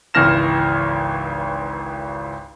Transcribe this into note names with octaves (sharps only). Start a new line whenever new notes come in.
G#1 C#2 E3 F6 A#6 E7